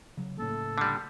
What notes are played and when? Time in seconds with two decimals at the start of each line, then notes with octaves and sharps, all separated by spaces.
0.17 C#3 F#3
0.39 A2 C#3 A#3 A4
0.78 D3 G3